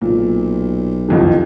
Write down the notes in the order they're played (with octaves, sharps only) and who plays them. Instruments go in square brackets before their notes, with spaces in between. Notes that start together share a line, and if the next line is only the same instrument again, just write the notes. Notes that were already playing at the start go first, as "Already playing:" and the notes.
[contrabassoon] B1 [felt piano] A#2
[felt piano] C2 F2 D#3